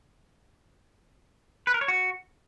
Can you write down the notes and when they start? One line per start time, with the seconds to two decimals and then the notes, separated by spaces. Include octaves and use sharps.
1.67 B4
1.74 A#4
1.81 C#5
1.88 F#4